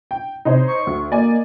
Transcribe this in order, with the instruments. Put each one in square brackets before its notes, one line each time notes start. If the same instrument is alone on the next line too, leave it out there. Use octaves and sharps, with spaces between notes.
[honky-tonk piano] G5
[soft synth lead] C3 [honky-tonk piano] D#4 C5 C#5
[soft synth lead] C#6
[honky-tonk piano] D2
[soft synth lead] A#3 [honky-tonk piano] D5 D#5 G#5